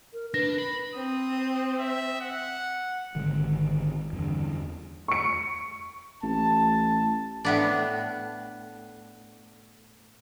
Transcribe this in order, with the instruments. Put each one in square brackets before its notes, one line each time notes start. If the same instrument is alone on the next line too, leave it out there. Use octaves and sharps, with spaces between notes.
[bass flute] A#4
[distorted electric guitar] D4 [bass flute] B4 [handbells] A#6
[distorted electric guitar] B5
[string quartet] C4 [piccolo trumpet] D#6
[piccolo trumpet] E5
F#5
[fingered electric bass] G#1 D3 D#3 G#3
E2 G2 D3
[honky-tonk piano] C#6 C#7
[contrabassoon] A1 [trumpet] A5
[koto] A2 B3 D4